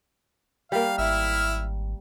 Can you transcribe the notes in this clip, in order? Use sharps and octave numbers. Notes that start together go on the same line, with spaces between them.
G3 A#3 F5
G#1 E4 E5 F6